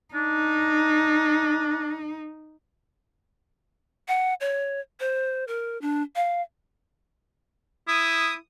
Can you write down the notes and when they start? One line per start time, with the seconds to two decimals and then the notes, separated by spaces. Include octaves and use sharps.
0.15 D4 D#4
4.08 F#5
4.41 C#5
5.00 C5
5.48 A#4
5.82 D4
6.16 F5
7.88 E4 D#6